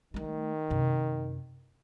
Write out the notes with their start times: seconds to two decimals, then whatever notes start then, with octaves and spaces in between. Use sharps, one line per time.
0.14 D#3 G3 A3
0.70 F#2 C3